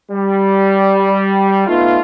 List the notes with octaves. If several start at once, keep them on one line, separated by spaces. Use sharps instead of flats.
G3
A3 B3 D#4 F4